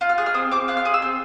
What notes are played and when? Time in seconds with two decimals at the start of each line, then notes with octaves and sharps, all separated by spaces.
0.01 F4 F#6
0.09 F6
0.18 G#4 F#6
0.26 F6
0.34 C4 D#6
0.51 C4 D6
0.68 F4 F#6
0.77 F6
0.85 G#4 D#6
0.94 E6
1.02 C4